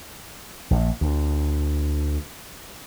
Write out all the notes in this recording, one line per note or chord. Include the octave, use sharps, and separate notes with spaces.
A#1
D2